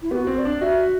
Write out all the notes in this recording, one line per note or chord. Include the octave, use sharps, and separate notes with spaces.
E4
B3 F#4 G4
C4
D5
D4
F#4 E5